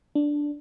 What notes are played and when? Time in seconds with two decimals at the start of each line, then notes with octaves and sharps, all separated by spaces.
0.15 D4